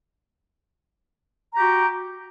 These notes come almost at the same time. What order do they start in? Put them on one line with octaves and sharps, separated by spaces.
A#5 G4 F#4